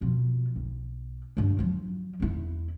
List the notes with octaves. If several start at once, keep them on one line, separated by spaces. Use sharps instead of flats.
B2 F3
B1
G2 D4
F3 F#3
E2 E4